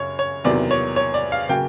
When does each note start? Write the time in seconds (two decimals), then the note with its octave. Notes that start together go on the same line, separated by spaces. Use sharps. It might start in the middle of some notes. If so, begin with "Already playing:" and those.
Already playing: F#2 C#3 C#5
0.19 C#5
0.44 E2 C3 D#3 F#3 A#3 D5
0.71 C#5
0.96 C#5
1.14 D5
1.32 F5
1.49 C#3 F#3 A#3 G5